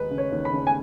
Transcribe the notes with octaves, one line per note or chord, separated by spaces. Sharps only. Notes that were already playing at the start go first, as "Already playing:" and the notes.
Already playing: D#2 G#3 D#4 B4
C#3
C#5
D#2
B5
C#3
G#5